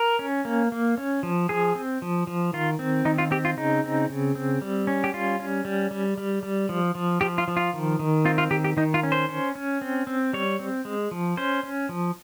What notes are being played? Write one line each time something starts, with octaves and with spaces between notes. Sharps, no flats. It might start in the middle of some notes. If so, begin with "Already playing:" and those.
Already playing: A#4
C#4
A#3
A#3
C#4
F3
F3 G#4
C4
F3
F3
D#3 F4
C4
D#3 D#4
F4
C4 G4
F4
C#3 D#4
C4
C#3
C4
G3
C#4
G4
G3 F4
C#4
G3
G3
G3
G3
F3
F3
F3 G4
F4
F3
F4
D#3
D#3
C4 F4
F4
D#3 G4
G4
D#3 D#4
F4
C#4
C5
C#4
C#4
C4
C4
G3 C#5
C4
G#3
F3
C#4 C5
C#4
F3